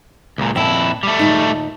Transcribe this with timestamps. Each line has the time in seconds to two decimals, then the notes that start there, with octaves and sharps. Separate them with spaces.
0.38 C#2 A#2
0.55 F2 A#2 E4 G5 A5
1.03 G3 A3
1.19 D#2 A#2 D#4